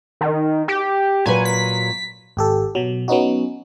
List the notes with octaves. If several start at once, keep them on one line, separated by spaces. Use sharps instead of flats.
D#3
G4
A#2 F#3 B4 G#5
B6
G#1 G4 A4
B2 F#3
F#3 B3 C#4 D#4 F#4